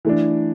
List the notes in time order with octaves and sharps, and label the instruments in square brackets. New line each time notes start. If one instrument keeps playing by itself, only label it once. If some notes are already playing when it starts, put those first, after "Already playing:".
[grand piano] E3 A3 D4